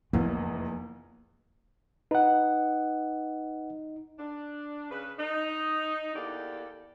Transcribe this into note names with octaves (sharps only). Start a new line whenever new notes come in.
F1 E2 E3 F3 A#3 B3
D#4 B4 F#5
D4
C#3 B4
D#4
E2 A#3 G4 A4 D5